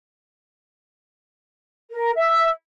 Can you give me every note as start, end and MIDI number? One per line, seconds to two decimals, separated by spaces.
1.91 2.11 70
2.16 2.47 76
2.16 2.47 88